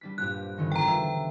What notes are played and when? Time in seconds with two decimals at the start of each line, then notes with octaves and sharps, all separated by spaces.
0.01 G3 D4 B6
0.18 A#1 G2 G4 F#6
0.58 G1 D3 D#3
0.72 E1 F2 G5 A#5
0.88 E5